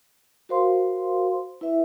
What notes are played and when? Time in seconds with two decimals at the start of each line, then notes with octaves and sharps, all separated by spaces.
0.49 F#4 A#4 C5 F5 C6
1.61 E4 B4 E5